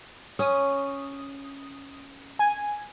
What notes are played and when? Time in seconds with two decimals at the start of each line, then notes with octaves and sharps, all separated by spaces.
0.39 C#4 D#6
2.39 G#5